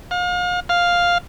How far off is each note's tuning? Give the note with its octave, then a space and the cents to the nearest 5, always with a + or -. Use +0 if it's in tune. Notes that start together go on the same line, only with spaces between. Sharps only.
F5 +40
F5 +5